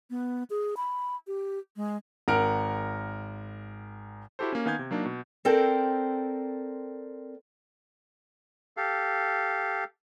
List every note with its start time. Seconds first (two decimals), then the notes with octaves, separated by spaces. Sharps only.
0.10 B3
0.50 G#4
0.77 B5
1.27 G4
1.76 G#3
2.28 G#1 A#4 F#5 F6 D7
4.39 E4 F#4 G4 A4 C5
4.52 A#3 C#4
4.65 D#3 B3 F5 G#5 G6 G#6
4.79 C3
4.91 F#3 A#3 D4 D#4
5.05 B2
5.45 C4 A4 A#4 C5 D5 G5
8.77 G4 A4 F5